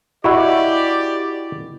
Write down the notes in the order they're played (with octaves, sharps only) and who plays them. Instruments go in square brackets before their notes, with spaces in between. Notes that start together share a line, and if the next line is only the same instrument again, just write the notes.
[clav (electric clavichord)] E4 F#4 [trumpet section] G4 D5 [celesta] D#5 B5 C#6